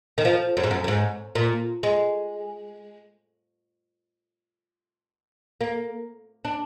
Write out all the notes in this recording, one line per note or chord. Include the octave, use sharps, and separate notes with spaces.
D#3
F3
F#2
G#2
F#2
F#2
G#2
A#2
G#3
A#3
D4